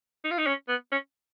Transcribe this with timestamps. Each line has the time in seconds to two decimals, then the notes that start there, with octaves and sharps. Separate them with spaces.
0.25 D#4
0.31 F4
0.38 D#4
0.46 C#4
0.68 B3
0.92 C#4